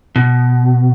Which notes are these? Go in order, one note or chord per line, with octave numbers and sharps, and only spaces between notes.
B2